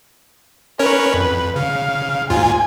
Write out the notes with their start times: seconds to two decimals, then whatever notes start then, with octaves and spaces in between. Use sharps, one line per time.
0.79 C#4 A#4 B4 C#5
1.14 F2
1.56 C#3 F5
2.30 D#2 G#2 F4 G#5